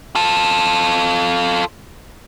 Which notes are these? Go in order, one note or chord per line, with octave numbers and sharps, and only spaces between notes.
F4 A4